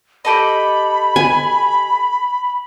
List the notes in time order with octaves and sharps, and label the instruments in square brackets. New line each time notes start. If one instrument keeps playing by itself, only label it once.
[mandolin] G4 A4 D#5 [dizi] B5
[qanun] G#5